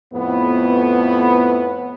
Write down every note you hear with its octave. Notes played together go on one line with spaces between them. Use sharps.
F2 A2 B3